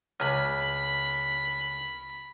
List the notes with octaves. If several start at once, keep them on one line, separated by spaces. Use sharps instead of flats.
C#2 B5